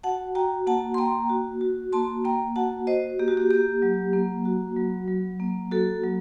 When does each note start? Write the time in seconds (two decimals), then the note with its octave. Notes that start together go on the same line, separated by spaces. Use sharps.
0.03 F#4 F#5 A5
0.35 F#4 G5 A#5
0.67 A#3 F#5 A5
0.94 C6
0.98 A#3 G5 A#5
1.30 F#4
1.61 F#4
1.92 A#3 A5 C6
2.25 A#3 G5 A#5
2.56 F#4 F#5 A5
2.87 F#4 C5 D#5
3.19 A#3 G4
3.28 F#4
3.37 G4
3.51 A#3 G4
3.82 F#3
4.13 A#3
4.45 F#4
4.76 F#3
5.08 F#3
5.40 A#3
5.71 F#4 A4
6.03 F#3